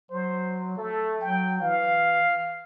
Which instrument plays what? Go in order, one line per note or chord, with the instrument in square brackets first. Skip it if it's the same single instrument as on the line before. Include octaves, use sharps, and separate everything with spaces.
[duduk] F#3 [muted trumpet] C5
[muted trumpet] A3 [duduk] A4
[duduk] F#3 [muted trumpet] G5
[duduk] E3 [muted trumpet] F5